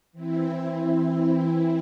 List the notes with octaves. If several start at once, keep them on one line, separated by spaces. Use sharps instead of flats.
E3 C4 E4